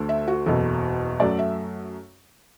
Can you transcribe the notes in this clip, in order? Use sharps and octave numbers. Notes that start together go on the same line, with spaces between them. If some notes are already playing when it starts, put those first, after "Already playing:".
Already playing: D2 D3 A3
E5
F#4
F#1 E2 B2 A4
F#2 F#3 A3 D5
E5